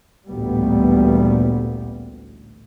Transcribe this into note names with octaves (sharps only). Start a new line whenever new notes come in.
A1 D2 A#2 G3 B3